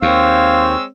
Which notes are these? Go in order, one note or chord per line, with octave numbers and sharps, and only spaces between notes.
D#2 G#3 C4 C#5 F5 E6